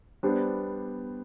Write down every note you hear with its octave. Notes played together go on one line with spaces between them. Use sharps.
G3 B3 D4 G4 C5